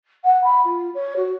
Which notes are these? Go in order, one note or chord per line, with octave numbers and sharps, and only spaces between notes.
F#5
B5
F4
C#5
F#4